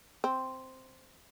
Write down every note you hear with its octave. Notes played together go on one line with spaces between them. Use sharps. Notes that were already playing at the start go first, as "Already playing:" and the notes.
C4